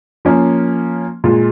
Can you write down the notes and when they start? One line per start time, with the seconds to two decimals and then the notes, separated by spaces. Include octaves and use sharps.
0.25 F3 A#3 C#4
1.24 A#2 G#3 F4